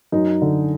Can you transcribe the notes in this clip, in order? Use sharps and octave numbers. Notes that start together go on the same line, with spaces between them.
F#2 D#4
D3